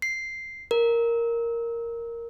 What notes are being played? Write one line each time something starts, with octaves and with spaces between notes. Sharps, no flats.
C7
A#4